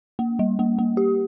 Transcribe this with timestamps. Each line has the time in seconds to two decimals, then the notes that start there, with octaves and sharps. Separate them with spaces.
0.19 A#3
0.39 G3
0.59 A#3
0.79 A#3
0.97 G4